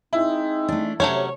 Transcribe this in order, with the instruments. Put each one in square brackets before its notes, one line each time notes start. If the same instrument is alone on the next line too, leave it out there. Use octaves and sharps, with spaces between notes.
[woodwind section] G#3 C4 D#4 [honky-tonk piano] E4
[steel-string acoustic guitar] A3 D4
[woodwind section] C3 [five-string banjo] F#3 A3 C#4 [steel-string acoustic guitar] C#5